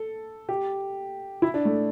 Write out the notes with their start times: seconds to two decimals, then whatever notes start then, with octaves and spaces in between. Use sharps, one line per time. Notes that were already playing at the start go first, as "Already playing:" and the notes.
Already playing: A4
0.49 G4
1.42 E4
1.54 D4
1.65 A3